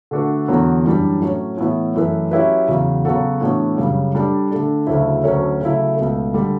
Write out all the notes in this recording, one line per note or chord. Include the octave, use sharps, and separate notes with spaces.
D3 A3 D4 F#4 B4
E2 D3 F#3 B3
F#2 E3 G3 D4
A2 F#3 C#4
A2 E3 B3 E4
F#2 E3 A3 E4 B4
F#3 C#4 E4 G4 B4
E2 C#3 F#3
C#3 F#3 B3 F#4 A4
A2 E3 B3 D4 F#4
F#2 C#3 G3
G3 D4 A4 D5
D3 A3 D4
D2 C#3 F#3 A3 E4
D2 D3 F#3 A3 C#4
C#3 F#3 A3 E4
C#2 B2 A3
D3 G3